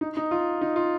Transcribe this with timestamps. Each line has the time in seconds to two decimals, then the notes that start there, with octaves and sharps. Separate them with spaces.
0.01 D#4
0.17 D#4
0.31 F4
0.61 D#4
0.76 F4